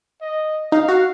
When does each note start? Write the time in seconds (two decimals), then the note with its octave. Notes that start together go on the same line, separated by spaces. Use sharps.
0.21 D#5
0.72 D#4 F5
0.88 F#4